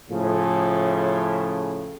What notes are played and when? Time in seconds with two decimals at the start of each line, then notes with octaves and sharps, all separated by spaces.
0.10 A2 C#3 F3